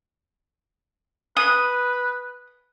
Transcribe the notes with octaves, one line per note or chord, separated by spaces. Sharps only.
B4 D#6